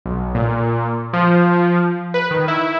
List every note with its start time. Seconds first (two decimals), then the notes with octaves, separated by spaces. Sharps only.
0.06 B1
0.35 A#2
1.13 F3
2.14 B4
2.31 D#3
2.48 E4